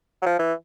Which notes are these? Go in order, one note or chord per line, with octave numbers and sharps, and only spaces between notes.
F#3
F3
E3